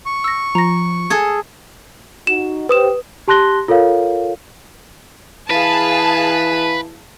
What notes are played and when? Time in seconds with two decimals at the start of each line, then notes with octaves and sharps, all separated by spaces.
0.06 C#6
0.24 E6 A#6
0.55 F3 A#5 A#6
1.10 G#4 A4 G#6
2.27 D#4 F#4 E7
2.69 G4 B4 C5 D#6 E7
3.28 G4 A5 C6 F#6 A#6 G7
3.68 F4 A4 A#4 C#5 F5
5.50 E3 G#4 B4 F5 A5